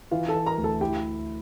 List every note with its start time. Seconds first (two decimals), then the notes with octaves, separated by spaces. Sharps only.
0.11 E3 F4 F5
0.28 A4 A5
0.34 E3
0.46 A#4 A#5
0.58 D2
0.64 A4 A5
0.81 E4 G4 G5